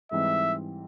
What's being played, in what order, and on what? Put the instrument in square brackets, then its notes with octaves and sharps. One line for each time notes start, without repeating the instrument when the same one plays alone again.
[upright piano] G#2 E3 G3 C4 D#4 [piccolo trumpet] E5